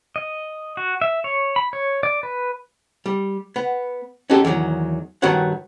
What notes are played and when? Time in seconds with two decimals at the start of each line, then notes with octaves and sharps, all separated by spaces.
0.16 D#5
0.77 F#4
1.02 E5
1.24 C#5
1.56 B5
1.73 C#5
2.03 D5
2.23 B4
3.06 G3
3.56 B3
4.30 C#4 D#4 F#4 G4 A4
4.45 E2 D3 D#3 F#3
5.22 G2 D#3 F#4 B4 C#5 F#5